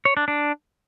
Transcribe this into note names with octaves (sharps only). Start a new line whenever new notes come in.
C#5
D4
D4